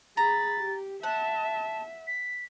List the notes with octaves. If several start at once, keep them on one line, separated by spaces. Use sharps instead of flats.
G#4 A#5 B5 A6
G4
E5 F#5 A5
B6